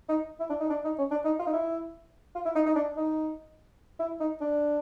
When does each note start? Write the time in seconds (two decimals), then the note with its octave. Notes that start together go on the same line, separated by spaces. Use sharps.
0.09 D#4
0.40 E4
0.50 D4
0.60 D#4
0.70 D4
0.84 D#4
0.98 C#4
1.11 D4
1.25 D#4
1.39 F4
1.47 D#4
1.53 E4
2.35 F4
2.45 E4
2.55 D#4
2.66 D#4
2.75 D4
2.97 D#4
3.99 E4
4.20 D#4
4.41 D4